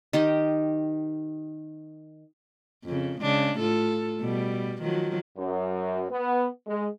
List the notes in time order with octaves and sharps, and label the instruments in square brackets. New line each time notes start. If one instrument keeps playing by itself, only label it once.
[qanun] D#3 G4 D#5
[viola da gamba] F2 C#3
C#3 G#3 D4
A2 F4 A4
B2 G3
D#3 F3 F#3
[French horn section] F#2
B3
G#3